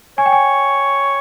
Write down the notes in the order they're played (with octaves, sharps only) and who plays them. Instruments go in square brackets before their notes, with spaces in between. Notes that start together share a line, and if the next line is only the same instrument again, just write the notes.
[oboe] C#5 [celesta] G#5
[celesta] G5
G#5